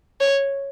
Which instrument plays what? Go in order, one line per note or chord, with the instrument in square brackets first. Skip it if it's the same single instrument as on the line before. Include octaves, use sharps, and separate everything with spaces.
[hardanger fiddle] C#5